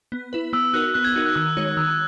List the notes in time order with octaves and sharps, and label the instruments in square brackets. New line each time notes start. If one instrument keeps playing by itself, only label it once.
[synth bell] B3
E4 B4
[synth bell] B3 [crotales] E6
[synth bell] D#4 F#4 A#4 [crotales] F#6
[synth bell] B3 [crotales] F#6
[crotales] G#6
[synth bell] D#4 F#4 A#4 [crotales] G#6
[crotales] F#6
[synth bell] D#3 [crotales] E6
[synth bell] G#3 D#4 F#4 C#5
[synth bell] D#3 [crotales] E6